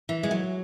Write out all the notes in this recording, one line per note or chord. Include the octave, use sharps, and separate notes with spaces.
E3
G#3
F#3